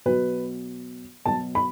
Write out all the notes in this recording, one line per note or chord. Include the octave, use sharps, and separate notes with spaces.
B2 F#3 B4
B2 F#3 A5
B5